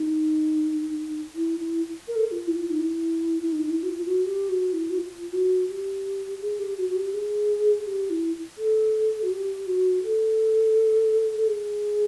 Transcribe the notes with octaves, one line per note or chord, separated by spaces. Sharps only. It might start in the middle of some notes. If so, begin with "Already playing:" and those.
Already playing: D#4
E4
E4
A#4
A4
A#4
F4
E4
F4
D#4
E4
E4
D#4
D#4
E4
F#4
F4
F4
F#4
G4
F#4
E4
F#4
F4
F#4
G4
G#4
G4
F#4
F#4
G4
G#4
G4
E4
A4
F#4
G4
F#4
A4
A4
G#4